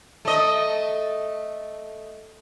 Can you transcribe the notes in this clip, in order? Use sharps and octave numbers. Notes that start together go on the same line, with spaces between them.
A3 D#5